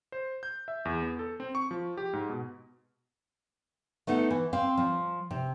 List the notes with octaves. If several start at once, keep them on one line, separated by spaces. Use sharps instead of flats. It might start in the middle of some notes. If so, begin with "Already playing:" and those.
C5
G6
E5
E2
B3
A4
C4
C#6
F3
G4
G#2
B2
A3 B3 D#4 A4 F#5
E3
C4 F5
F3
C3